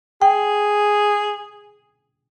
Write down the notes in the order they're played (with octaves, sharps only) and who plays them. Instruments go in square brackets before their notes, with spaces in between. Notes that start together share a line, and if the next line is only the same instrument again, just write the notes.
[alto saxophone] G#4 [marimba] G5